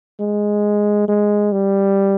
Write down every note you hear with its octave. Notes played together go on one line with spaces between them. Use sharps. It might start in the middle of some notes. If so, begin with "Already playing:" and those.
G#3
G#3
G3